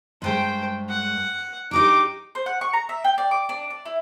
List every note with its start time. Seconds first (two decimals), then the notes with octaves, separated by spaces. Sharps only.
0.22 G2 G#3 A3 C5 G5
0.89 F#5
1.71 D4 D#4 G4 C5 D6
2.35 C5
2.46 F#5
2.61 C#6
2.73 A#5
2.89 E5
3.04 G5
3.18 D5
3.31 D6
3.49 D4
3.70 D5
3.85 E4